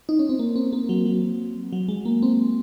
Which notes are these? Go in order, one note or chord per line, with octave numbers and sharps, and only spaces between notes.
D#4
C#4
C4
A#3
C4
A#3
F#3
F#3
F#3
G#3
A#3
C4